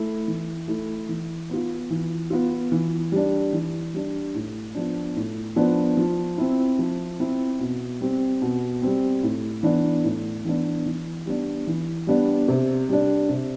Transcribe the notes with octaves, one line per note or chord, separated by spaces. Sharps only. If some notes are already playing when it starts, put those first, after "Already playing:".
Already playing: A3 E4
E3
A3 E4
E3
B3 F4
E3
B3 F4
E3
G3 D4
E3
G3 D4
A2
F3 B3 D4
A2
F3 B3 D4
F3
C4 E4
F3
C4 E4
B2
G3 C4
B2
G3 C4
A2
E3 B3 D4
A2
E3 B3 D4
E3
G3 B3 D4
E3
G3 B3 D4
C3
G3 D4
C3